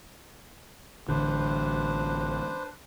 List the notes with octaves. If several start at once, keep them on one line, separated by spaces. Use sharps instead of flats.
A1 D3 D4 B4 C5